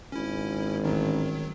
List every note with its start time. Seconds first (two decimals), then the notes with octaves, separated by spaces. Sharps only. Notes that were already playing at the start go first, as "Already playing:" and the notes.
0.12 G#1 C#4 E4
0.84 A1 D#3 F#3